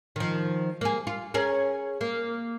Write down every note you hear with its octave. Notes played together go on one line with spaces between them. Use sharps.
D#3 F3
A#3 G#4
F4
C#4 G#4 A#4
A#3